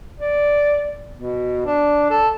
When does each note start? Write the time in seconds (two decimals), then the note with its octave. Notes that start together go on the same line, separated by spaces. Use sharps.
0.20 D5
1.14 B2
1.66 D4
2.10 A4